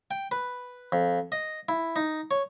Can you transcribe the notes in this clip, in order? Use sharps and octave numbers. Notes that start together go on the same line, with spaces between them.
G5
B4
F2
D#5
E4
D#4
C#5